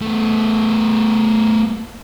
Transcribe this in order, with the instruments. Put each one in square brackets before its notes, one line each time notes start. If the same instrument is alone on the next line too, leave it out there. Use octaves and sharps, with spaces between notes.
[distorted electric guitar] A3 B3